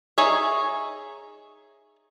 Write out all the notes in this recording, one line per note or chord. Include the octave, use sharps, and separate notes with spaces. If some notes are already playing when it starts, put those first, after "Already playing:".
D#4 G#4 C#5 E5